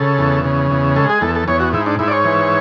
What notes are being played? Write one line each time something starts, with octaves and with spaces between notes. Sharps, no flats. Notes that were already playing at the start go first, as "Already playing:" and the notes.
Already playing: C#3 A4
E2
C#3
E2
G#3 A4
G#4
E2 A4
A4
E2 C#5
F#4
G#2 E4
D4
G#2 E4
D5
C#5
E3